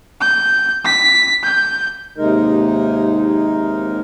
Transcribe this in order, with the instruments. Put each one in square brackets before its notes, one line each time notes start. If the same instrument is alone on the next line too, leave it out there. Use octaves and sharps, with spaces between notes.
[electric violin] G6
B6
G6
[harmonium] D#2 C3 G#3 D#4 A#4